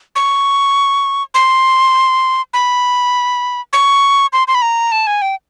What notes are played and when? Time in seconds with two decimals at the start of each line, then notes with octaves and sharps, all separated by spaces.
0.16 C#6
1.34 C6
2.54 B5
3.73 C#6
4.33 C6
4.48 C6
4.55 B5
4.62 A#5
4.92 A5
5.07 G#5
5.22 G5